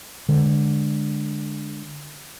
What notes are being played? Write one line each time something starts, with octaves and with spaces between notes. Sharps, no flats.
D3 G#3